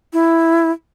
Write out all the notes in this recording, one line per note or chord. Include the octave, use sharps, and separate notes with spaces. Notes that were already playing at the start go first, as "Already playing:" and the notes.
E4